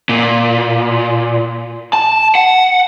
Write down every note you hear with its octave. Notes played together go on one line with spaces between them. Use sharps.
A#2
A5
F#5